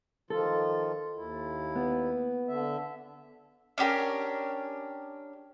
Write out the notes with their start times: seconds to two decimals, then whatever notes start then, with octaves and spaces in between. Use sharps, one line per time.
0.30 D#3 F3 F4 A4
1.16 D#2 E4
1.76 B3
2.48 D3 E5
3.78 C#4 D4 G4 A#4